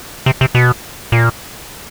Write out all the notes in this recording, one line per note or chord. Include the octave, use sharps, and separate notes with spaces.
C3
C3
B2
A#2